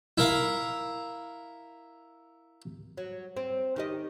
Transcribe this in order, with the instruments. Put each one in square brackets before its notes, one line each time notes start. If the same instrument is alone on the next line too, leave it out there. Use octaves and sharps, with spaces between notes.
[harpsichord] E4 A#4 F5
[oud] F#3
C4
D#3 G4 D#5